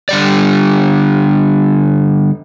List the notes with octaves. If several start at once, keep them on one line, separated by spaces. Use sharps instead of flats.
D3 G3 D5